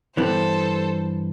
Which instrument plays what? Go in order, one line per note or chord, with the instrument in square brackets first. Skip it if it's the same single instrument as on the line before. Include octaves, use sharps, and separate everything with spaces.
[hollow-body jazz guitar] G2 E3 B3 [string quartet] A4 C5